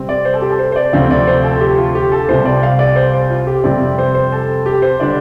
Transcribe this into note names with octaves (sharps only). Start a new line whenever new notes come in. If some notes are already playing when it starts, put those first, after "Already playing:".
Already playing: C3 G3 C4
D5
C5
A4
G4
A4
C5
C5
D5
D2 C3 F3 C4 F5
D5
C5
A4
G4
F4
G4
A4
C2 C3 G3 C5
D5
F5
D5
C5
C5
F4
G4
F2 C3 G3 C4 D5
C5
C5
A4
G4
C5
D3 G3 D4 D5